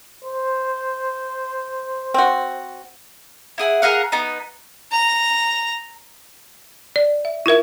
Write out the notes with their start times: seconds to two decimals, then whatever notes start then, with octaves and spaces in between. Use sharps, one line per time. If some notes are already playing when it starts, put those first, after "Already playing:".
0.25 C5
2.14 C4 F#4
3.58 E4 G#4 F#5
3.82 G#4 A#4 F5 F#5
4.12 B3 D#4
4.92 A#5
6.96 D5
7.25 E5
7.46 E4 F4 A#4 E5